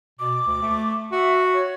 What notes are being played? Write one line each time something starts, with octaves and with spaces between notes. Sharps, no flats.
B2 D6
D2
A3
F#4 E5
C#5